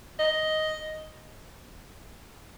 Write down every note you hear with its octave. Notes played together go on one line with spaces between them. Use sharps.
D#5